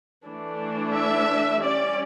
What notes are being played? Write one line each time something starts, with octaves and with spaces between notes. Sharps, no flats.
E3 A3 D4
E5
G3 C#4 D5